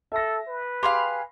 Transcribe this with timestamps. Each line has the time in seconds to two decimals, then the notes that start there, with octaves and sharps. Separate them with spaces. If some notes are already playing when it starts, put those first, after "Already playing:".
0.12 A4 E5 A#6
0.47 B4
0.83 G4 G#4 F5 B5 C6